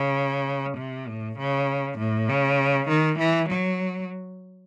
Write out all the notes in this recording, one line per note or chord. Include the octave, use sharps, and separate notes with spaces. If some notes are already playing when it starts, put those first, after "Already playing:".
Already playing: C#3
C3
A2
C#3
A2
C#3
D#3
E3
F#3